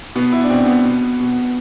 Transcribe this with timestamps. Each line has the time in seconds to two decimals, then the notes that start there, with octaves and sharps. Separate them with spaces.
0.16 B2 B3
0.32 E4
0.43 D4
0.50 B2 C4
0.67 B3
0.85 B2
1.20 B2